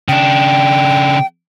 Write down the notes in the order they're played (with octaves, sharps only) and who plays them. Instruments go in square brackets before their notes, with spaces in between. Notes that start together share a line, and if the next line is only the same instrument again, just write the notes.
[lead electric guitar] C#3 D4 [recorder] G5